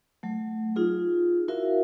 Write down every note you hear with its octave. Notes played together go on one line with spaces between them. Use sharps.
F#3 A3
D#4 F4 G#4
E4 F#4 A#4 E5 F5